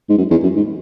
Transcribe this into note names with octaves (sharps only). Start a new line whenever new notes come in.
G#2
F#2
E2
F#2
G#2